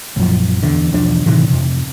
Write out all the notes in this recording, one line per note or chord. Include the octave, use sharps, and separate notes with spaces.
A#1 F#2 F3
E2 D3
B1 E2 F3 D4
A2 C3 D#3 E3
F2 C3